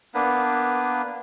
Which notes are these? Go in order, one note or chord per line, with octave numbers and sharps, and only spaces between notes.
A#3 B3 D4 B4